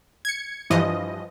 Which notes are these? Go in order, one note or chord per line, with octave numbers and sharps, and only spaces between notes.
G#6 C#7
G2 E3 F3 D#5